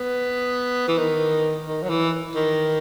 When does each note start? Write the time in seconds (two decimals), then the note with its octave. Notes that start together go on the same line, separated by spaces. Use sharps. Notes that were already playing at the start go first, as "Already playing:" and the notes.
Already playing: B3
0.88 E3
0.98 D#3
1.66 D#3
1.83 F#3
1.89 E3
2.35 D#3